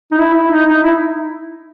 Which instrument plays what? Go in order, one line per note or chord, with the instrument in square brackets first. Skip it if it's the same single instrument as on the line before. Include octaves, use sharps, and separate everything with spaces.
[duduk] D#4
E4
E4
D#4
D#4
E4